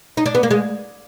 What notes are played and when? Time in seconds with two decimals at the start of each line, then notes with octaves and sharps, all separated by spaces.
0.17 D#4
0.26 D4
0.35 B3
0.43 A#3
0.51 G#3